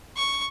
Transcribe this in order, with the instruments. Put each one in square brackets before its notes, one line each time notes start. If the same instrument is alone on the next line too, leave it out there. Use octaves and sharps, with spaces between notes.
[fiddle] C#6